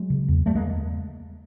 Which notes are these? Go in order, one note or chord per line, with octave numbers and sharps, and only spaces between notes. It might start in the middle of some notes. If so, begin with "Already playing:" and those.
Already playing: F#3 G#3
C#3
E2
E2 G3 A3
G#3 A#3